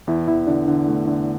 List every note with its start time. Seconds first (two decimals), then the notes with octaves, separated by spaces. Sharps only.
0.07 E2 E4
0.28 E2 E4
0.47 D3 D4
0.68 D3
0.88 A3
1.07 D3